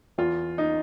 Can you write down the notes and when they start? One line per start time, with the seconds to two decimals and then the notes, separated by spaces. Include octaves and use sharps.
0.18 E2 F4
0.58 D#4